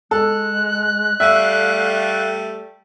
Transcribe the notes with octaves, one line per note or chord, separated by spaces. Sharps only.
G#3 A4 F#6
G3 A3 E5 F5